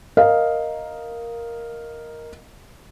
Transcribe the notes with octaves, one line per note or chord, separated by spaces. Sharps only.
A#4 D#5 F5